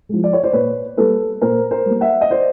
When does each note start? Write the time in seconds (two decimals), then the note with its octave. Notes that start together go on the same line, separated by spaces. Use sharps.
0.09 F3 G#3
0.24 D5
0.33 C#5
0.43 C5 D5
0.53 A#2 B4 C#5
0.97 G3 A#3 A4 B4
1.41 A#2 A#4 C5
1.71 A#4 C5
1.86 G3 A#3
2.01 E5 F#5
2.21 D#5
2.30 C5 D5